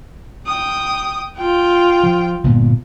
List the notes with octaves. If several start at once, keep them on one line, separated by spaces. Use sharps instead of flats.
G5 D#6
F4 G5
F3
G1 A#2 B3